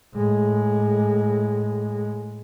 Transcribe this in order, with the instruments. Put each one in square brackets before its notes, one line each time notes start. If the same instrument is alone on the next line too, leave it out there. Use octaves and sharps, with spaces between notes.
[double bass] A2 G#3